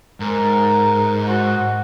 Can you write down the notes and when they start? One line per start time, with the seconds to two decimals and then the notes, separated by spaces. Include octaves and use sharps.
0.20 G#2 A#4
1.27 F#4